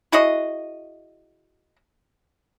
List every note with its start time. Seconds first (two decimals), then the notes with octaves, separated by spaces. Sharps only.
0.12 E4 F#4 G#4 D#5